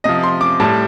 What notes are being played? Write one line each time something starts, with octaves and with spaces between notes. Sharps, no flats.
C3 F3 D#5
C6
D6
A2 G3 A5